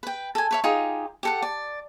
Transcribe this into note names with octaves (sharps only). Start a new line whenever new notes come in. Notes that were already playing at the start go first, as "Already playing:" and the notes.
B4 G5
A4 G#5
B4 C#5 E5
D#4 F4 G4 G#4
G4 A4 F#5
D5